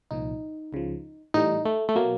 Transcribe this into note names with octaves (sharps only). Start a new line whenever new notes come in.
C2 A#2 F3 D#4
C#2 C#3 F3
A2 E3 G3 D#4
A3
A3
B2 F#3 A#3